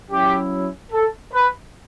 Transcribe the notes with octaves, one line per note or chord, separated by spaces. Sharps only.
F#3 C#4 E4 G4
A4
B4